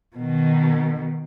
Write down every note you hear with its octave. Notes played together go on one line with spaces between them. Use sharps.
B2 D#3